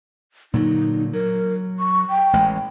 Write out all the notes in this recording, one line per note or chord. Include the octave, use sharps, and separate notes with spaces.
A#2 D3 F#3 D#4
F#3 A#4
C#6
G5
A1 G#3